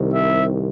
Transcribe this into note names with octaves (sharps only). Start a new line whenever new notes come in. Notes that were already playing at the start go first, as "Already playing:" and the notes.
Already playing: C2 C3 D#3
E5